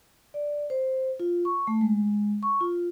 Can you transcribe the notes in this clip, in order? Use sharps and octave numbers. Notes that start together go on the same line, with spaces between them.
D5
C5
F4
C#6
A3
G#3
C#6
F4